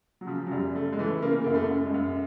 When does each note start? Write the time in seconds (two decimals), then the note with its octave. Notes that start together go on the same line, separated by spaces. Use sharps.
0.21 F#3
0.27 C#3 F3
0.47 F#3
0.51 F#2 G3
0.75 C#3 A3
0.92 G#3
0.99 E3 A3
1.22 C#3 A#3
1.44 F#2 A#3
1.55 A3
1.70 F#2
1.85 G#3
1.94 F#2